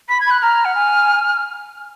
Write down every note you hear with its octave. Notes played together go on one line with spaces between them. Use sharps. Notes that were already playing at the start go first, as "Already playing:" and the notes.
B5 B6
G#6
B5 F#6
A#5 F6
F#5
G#5